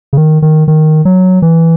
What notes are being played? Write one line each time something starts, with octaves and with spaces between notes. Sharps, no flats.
C#3
D#3
D#3
D#3
F#3
E3